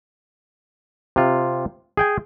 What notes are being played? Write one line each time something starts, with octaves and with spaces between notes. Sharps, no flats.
C3 F4
G#4 G5 G#5